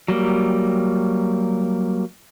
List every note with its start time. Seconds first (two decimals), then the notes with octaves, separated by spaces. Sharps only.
0.08 F#3 G3 A#3